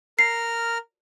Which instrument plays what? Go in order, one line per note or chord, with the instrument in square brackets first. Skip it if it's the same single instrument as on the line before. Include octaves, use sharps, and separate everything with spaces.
[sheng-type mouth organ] A#4 F6 [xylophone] C7